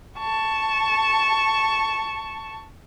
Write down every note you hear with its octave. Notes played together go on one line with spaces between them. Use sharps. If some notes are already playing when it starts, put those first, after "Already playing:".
A5 C#6